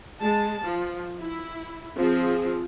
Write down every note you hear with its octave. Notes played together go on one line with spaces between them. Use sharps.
G#3 A5
F3
E4
F3 C4 G#4